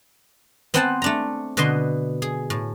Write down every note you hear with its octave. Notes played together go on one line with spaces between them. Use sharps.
B3 C4 C5 F#5 G#5 A5
A3 D4 A#5
B2 D3 B4 D#5 C6
G#4
A2